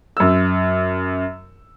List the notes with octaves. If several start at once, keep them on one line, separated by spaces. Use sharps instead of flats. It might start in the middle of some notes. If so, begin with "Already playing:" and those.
F#2 E6